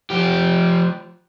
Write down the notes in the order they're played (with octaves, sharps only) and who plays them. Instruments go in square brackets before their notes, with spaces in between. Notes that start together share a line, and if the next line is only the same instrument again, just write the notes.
[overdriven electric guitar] F3 G4